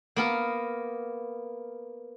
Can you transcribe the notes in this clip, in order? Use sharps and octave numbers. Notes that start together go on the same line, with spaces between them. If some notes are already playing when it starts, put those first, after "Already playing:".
A#3 B3 A#4